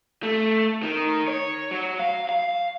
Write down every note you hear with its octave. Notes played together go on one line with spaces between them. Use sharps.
A3
D#3
C#5
F#3
F5
F5